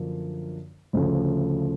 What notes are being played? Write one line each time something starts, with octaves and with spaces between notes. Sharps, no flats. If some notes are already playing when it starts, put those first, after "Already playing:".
Already playing: F#2 D3 F3 A#3 D4
D2 C#3 F3 A3